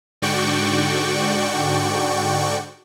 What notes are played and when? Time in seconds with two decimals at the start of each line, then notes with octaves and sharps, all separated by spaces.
0.22 G#2 D3 F#4 D5 G5 C#6